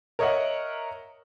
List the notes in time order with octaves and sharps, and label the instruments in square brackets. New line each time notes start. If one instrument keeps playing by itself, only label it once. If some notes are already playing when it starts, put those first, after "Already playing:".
[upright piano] A#4 C#5 D#5 E5 F#5